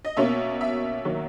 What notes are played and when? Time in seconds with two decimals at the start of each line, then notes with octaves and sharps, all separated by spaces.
0.05 D#5
0.17 B2 A#3 C#4 E5
0.61 E5
1.05 D#3 F#3 A#3